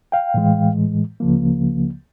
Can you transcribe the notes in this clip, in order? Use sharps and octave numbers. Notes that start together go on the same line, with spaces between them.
F5 G5
A2 E3 G#3
C#2 C#3 F3 A#3